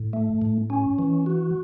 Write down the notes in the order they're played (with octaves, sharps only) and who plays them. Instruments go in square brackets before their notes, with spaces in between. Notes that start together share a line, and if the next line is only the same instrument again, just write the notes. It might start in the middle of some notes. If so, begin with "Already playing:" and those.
Already playing: [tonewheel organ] A2
A3
A2
C#4
E3
F#4